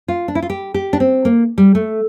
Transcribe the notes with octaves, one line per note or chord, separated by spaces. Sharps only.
F4
D4
E4
F4
G4
G4
D4
C4
A#3
G3
A3